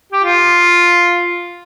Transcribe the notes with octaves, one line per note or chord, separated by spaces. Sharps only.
G4
F4